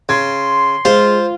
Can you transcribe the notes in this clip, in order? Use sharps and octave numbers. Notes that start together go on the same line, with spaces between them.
C#3 C6 G#6
G#3 F4 C5